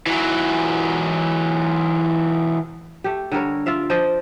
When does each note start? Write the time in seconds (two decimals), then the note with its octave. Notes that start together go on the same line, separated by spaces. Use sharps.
0.06 E3 F#3
3.04 A3 G4
3.32 D3 G3 A#4 C#5
3.66 F4 D5 E5 F5
3.90 F3 C5 D5 D#5